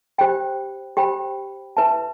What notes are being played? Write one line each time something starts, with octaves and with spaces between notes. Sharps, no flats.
G4 C5 G5 B5
G4 C5 G5 B5
E4 B4 E5 A5